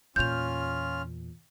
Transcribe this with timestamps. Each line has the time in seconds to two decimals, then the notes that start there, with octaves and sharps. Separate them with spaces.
0.16 E2 A#2 C#4 F4 F6 G6 F7